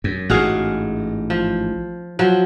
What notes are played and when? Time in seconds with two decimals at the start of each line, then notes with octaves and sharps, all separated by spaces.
0.04 F#2
0.30 A1 G#2 F#4 G#4 F5
1.30 F3
2.19 F3 F#3